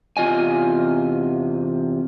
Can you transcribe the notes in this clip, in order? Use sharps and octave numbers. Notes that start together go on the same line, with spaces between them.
E2 C3 F4 D#5 G#5